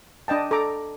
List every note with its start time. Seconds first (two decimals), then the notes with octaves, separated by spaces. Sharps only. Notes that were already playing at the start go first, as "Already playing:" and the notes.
0.28 D4 D#5 G5 A5
0.51 A4 A#5 D6